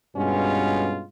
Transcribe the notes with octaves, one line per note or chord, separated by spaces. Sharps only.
G2 B2 G#3 C#4 F4